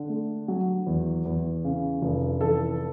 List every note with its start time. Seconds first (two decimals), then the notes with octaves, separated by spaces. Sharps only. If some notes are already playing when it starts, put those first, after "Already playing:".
Already playing: D3
0.09 A3
0.48 F#3
0.87 E2
1.25 E2
1.64 C#3
2.02 F1
2.41 E3 A4